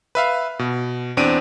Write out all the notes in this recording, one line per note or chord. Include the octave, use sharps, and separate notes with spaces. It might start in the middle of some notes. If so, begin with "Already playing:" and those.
B4 E5 F5
B2
E2 C4 D4 D7 D#7